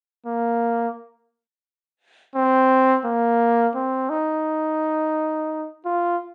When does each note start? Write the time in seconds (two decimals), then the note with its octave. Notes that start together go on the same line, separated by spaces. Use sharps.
0.26 A#3
2.35 C4
3.05 A#3
3.75 C4
4.10 D#4
5.85 F4